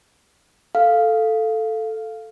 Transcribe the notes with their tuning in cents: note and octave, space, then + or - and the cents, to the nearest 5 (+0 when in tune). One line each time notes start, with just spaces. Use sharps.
A4 +0 F5 +0